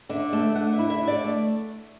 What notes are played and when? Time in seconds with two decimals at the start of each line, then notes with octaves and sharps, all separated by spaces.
0.09 D3 E5
0.33 A3 E5
0.55 D3 F#5
0.73 E5
0.79 E4
0.90 E5
1.02 D3
1.08 D5
1.24 A3